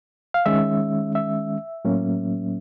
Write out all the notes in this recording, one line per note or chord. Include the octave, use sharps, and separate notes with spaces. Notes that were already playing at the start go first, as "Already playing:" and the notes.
F5
D#3 G#3 C#4 E5
E5
A2 F#3 A#3 C#4